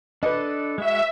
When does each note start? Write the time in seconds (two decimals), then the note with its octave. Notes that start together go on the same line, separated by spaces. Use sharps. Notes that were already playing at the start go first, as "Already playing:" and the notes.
0.23 D4 A4 B4 D5 D#5
0.78 G#3 F#4 E5